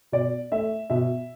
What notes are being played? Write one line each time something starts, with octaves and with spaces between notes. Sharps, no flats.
B2 D5
A3 E5
B2 E5